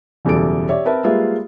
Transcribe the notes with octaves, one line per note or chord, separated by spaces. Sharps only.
F#1 E2 B2 G3 A4 D7
G4 C#5 D5 E5
C4 A#4 B4 E5 A5
G3 G#3 A#3 F4 B4 E5